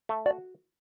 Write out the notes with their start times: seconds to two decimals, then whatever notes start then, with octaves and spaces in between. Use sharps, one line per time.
0.09 A3
0.26 F#4 D5